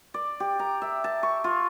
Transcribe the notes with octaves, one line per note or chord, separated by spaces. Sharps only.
D5
G4
A#5
E5
A5
C#6
F4